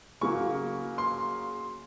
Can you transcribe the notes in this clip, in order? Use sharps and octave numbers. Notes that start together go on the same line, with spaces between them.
C#3 F#3 A#3 C#6
C6